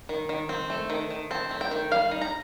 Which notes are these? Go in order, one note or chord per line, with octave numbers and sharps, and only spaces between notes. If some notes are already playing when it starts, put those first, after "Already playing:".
D#3
D#3
C4
A3
D#3
D#3
C4 A5
A3
G5
D#3
G3 F5
D#4
A#5